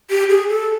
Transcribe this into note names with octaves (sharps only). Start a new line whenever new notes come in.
G4
G#4
A4